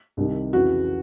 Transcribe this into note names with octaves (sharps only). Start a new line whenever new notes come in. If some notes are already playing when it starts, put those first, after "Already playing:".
C2 C3 D#3
F2 C#3 E3 F#4